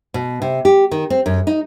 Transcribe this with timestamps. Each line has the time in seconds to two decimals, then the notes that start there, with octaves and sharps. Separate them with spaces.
0.14 B2
0.42 C3
0.65 G4
0.91 D#3
1.10 C4
1.26 F#2
1.47 D#4